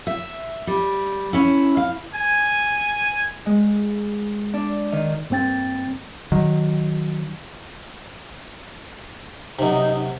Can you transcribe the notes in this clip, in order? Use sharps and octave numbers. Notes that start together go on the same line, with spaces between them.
E5
G3
C#4 E4
F5
G#5
G#3
D4
D#3
G2 A#3 C4 G5 A6
D#3 F#3
F#2 C3 D#4